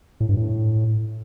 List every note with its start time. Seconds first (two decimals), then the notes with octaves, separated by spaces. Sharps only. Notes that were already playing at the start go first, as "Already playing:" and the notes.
0.20 A2
0.29 G2
0.37 A2